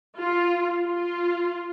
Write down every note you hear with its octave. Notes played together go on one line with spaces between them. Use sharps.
F4
F4